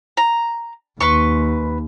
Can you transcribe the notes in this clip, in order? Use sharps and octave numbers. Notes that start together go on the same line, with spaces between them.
A#5
D#2 B4 C6 C#6